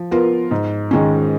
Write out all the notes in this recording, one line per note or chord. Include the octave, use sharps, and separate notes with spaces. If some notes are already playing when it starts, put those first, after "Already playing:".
Already playing: F3
B3 F4 A#4
G#2
D#3 G#3 C#4